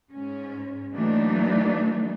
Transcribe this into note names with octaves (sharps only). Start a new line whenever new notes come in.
G#2 C#4
E3 F#3 A3 A#3 D4 D#4